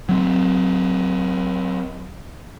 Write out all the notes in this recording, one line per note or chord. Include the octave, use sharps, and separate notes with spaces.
F#3 C4